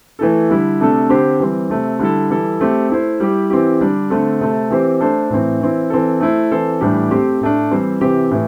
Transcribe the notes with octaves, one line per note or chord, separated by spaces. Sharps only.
E3 A3 E4 A4
D3 G3 E4
C3 A3 D4 A4
D3 C4 G4 C5
E3 G3 C4
C3 A3 C4
D3 G3 E4 A4
E3 G3 E4 A4
A3 C4 G4
A3 E4 C5
G3 E4 G4
E3 C4 E4 G4
D3 G3 D4
D3 A3 C4 A4
C3 A3 C4 A4
E3 C4 G4 C5
A3 D4 A4 C5
A2 E3 C4
E3 C4 E4
E3 C4 A4
A3 E4 C5
E3 C4 A4 C5
A2 E3 G3 D4 G4
A3 C4 G4 C5
A2 A3 D4
E3 G3 C4 E4 C5
C3 E3 C4 G4
A2 E3